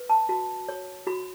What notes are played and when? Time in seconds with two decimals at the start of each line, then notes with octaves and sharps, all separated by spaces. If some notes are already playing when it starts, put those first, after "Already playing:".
Already playing: B4
0.10 A5
0.29 F#4 A5
0.69 C#5
1.07 F#4 B5